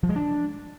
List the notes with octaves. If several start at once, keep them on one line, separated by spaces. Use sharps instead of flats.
F3
G#3
D4